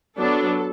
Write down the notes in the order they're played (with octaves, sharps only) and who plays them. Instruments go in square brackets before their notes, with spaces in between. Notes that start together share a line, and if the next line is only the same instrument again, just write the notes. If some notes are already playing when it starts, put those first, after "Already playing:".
[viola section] F#3 B3 D4 A4